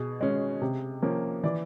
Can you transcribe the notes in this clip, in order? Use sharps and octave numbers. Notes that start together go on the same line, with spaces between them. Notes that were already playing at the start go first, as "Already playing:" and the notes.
Already playing: B2 G#4
G#3 C#4
C3
F3 A#3 C#4
E3 D5